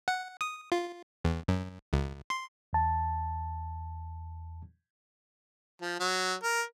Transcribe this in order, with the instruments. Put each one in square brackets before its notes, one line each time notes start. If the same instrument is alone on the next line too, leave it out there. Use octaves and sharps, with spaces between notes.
[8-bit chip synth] F#5
D#6
F4
E2
F#2
C#2
C6
[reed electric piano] E2 A5
[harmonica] F3
F#3
A#4